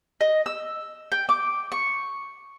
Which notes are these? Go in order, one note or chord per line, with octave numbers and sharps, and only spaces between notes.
D#5
E6
G5
D6
C#6